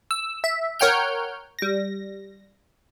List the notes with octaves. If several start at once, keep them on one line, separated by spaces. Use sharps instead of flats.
E6
E5
A#4 C#5 F#5 G5 F6 G6
G3 A#6